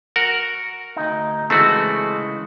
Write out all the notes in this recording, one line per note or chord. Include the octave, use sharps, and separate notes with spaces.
F#4 A#4 F#5
D2 D#4
C#3 E3 G#3 A3 C4 F#4